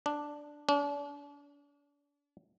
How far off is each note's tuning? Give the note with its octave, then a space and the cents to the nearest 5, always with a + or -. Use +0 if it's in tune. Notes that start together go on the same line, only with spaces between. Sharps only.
D4 +0
D4 -40